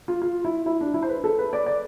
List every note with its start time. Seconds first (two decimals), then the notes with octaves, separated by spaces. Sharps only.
0.08 F4
0.22 F4
0.45 E4
0.66 E4
0.81 D4
0.94 E4
1.02 C5
1.09 B4
1.24 A4
1.39 B4
1.53 D5
1.66 D5